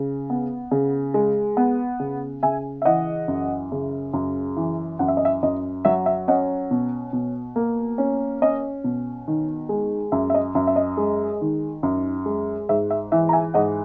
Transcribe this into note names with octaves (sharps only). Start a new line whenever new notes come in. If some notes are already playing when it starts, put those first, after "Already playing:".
Already playing: C#3
B3
C#3
G#3
B3
C#3
C#3 E5 G#5
E5
E3 D#5 F#5
F#2
C#3
F#2
E3
F#2 F#5
E5
D#5
E5
F#2 D#5
F#3 E5
E5
C#4 D#5 F#5
B2
B2
A#3
C#4
C#4 D#5
B2
D#3
G#3
F#2 E5
E5
D#5
F#2 E5
E5
D#5
G#3
D#3
F#2
G#3
G#2 E5
E5
E3 E5
A#5
E5 G#5
G#2 D#5 F#5